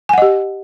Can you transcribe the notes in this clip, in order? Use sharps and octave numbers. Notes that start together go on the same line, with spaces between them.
G4 D#5 F#5 G#5